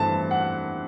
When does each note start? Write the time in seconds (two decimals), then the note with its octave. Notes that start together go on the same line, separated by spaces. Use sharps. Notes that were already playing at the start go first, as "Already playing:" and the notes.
Already playing: G2 E3 A3 C4 A5
0.31 F#5